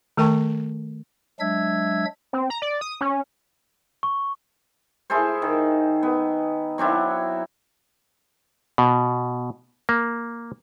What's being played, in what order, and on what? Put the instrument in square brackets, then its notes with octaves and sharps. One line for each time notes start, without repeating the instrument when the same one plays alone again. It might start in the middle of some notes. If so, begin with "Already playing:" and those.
[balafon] D#3 A3 A#4 G5 A5 C#6
[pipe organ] F#3 G#3 D4 E5 E6 G#6
[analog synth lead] C4
A#5
D5
D#6
C#4
[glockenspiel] C#6
[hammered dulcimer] E4 G#4 A4 C5
D#3
B3
F#3 C4 D4 E4
[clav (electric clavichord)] B2
A#3